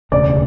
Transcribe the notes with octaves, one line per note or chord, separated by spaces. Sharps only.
E1 D2 C#3 D5